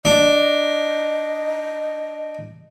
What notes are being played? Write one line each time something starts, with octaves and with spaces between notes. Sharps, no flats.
D4 D#5